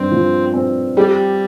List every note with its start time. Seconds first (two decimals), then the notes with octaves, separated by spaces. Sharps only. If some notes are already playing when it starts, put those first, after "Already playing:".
Already playing: G2 C4
0.11 F3
0.54 C4
0.97 G3 G4